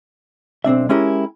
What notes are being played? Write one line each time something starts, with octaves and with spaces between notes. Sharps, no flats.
B1 C4 D4 E5
G#3 C#4 E4 G4 A#4